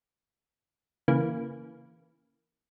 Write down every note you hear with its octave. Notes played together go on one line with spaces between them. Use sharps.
C#3 E3 A#3